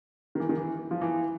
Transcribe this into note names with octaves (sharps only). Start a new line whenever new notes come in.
D#3
E3
D#3
E3
F3
E3